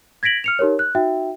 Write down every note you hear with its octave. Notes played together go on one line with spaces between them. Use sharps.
G#6 A#6 B6 D7 F#7
F6 C#7 F7
D#4 G4 A#4 C#5
F#6
D#4 F#4 E5 G5